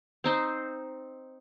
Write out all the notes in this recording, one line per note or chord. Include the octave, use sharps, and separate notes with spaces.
C4 D#4 C5